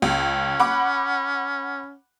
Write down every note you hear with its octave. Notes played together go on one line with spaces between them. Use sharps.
C#2 C#4
F#5 B5 D6